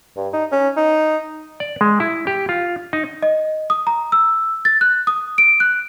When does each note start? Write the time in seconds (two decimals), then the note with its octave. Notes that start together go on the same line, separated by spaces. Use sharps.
0.16 G2
0.33 D#4
0.52 C#4
0.76 D#4
1.60 D5
1.81 G#3
2.00 E4
2.27 G4
2.49 F4
2.93 D#4
3.23 D#5
3.70 D#6
3.87 A#5
4.12 E6
4.65 A6
4.81 F#6
5.07 D#6
5.38 D7
5.60 F#6